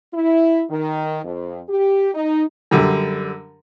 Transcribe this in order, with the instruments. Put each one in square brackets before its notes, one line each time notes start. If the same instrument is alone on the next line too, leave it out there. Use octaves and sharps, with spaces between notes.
[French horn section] E4
D#3
F2
G4
D#4
[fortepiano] F#2 D3 G3